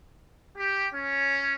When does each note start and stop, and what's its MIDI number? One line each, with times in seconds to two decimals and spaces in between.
0.56 0.87 67
0.94 1.54 61